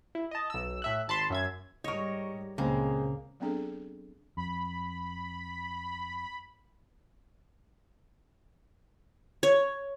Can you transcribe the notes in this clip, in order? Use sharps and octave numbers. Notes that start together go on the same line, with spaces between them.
E4
D#5 A5
B1 E6
A2 E5 F#6
G#1 A5 B5 C6
F#2 E5 G#6
G#2 G3 A#4 C#5 D#5 C#6
C#2 A#2 C#3 G#3 A#3 C4 G#4
F#3 B3 C4 D4 G#4 A4
F2 B5
C#5